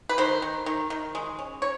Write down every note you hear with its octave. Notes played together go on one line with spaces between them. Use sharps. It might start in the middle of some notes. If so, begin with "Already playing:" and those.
B4
D#3 C5
D#3
D#3
D#3
G#3
C#4
C#5